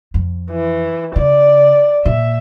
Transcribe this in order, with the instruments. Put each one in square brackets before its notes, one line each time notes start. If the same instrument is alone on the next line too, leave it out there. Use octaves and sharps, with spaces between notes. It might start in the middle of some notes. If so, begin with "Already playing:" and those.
[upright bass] F2
[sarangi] E3
[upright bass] C#3 [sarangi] D5
[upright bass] A#2 [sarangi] E5